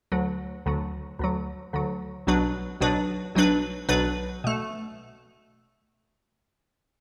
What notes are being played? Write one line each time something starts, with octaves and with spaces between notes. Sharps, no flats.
D2 D3 F#3
D2 D3 F#3
D2 D3 F#3
D2 D3 F#3
B1 B2 F#3 D4 B4
B1 B2 F#3 D4 B4
B1 B2 F#3 D4 B4
B1 B2 F#3 D4 B4
B2 A3